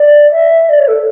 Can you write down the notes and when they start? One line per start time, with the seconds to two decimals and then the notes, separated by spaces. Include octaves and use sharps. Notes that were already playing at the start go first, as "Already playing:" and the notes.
Already playing: D5
0.31 E5
0.69 D5
0.79 C#5
0.88 A4